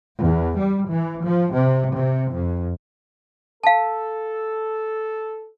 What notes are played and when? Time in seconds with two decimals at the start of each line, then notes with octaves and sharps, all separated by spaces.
0.22 E2
0.58 G3
0.90 E3
1.26 F3
1.55 C3
1.96 C3
2.35 F2
3.63 A4 F5 A5